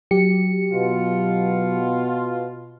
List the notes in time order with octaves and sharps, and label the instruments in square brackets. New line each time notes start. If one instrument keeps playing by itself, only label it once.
[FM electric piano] F#3 G4 C#7
[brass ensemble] B2 F4